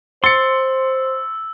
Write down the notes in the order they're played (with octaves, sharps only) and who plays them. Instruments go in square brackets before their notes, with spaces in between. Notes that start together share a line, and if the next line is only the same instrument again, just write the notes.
[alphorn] C5 [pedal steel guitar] C6 [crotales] E6 [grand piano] A6 C#7